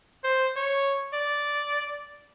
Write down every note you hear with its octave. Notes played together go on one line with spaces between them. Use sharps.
C5
C#5
D5